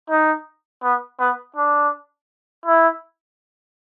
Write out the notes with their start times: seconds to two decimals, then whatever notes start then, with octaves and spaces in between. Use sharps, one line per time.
0.10 D#4
0.83 B3
1.20 B3
1.56 D4
2.66 E4